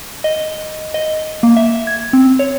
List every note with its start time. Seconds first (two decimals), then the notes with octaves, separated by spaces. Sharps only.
0.24 D#5
0.94 D#5
1.43 A#3
1.57 E5
1.87 G#6
2.13 C4
2.39 C#5